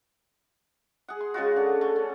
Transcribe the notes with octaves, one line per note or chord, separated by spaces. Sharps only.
G#4 F#5
C6
C#3 G#3 F4 F#4
D3
A3
C#4